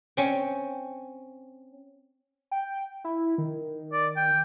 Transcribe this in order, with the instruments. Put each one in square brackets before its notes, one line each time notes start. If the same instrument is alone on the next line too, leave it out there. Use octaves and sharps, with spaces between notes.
[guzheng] C4 C#4
[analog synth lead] G5
E4
D#3
[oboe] D5
G5